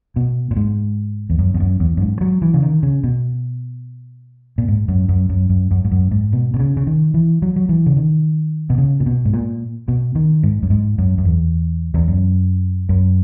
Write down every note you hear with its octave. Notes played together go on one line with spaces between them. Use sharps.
B2
A#2
G#2
E2
F#2
E2
F#2
E2
F#2
G#2
F#3
E3
C#3
D#3
C#3
B2
A#2
G#2
F#2
F#2
F#2
F#2
F#2
G#2
F#2
G#2
B2
B2
C#3
C#3
D#3
E3
F#3
F#3
E3
C#3
D#3
B2
C#3
A#2
B2
G#2
A#2
B2
D#3
G#2
F#2
G#2
F#2
F#2
E2
E2
F#2
F#2